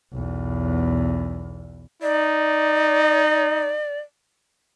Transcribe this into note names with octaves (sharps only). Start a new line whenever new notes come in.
B1 E2
D#4 D5